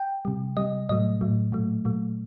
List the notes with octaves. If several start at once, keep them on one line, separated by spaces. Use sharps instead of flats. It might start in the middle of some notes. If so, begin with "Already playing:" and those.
Already playing: G5
C3 G3
C3 G3 D#5
A2 F#3 A3 D#5
A2 F#3 A3
A#2 F#3 A3
A#2 F#3 A3